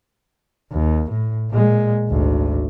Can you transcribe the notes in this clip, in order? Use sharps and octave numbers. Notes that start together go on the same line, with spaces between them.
D#2
A2
A#2 G#3
G#1 D2